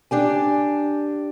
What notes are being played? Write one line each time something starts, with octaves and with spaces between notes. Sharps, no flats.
D4 G4 G#5